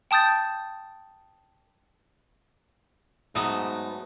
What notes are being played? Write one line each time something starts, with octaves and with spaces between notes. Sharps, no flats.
G5 A5 D#6 G6 A6
G#2 F#3 A3 B3 D#4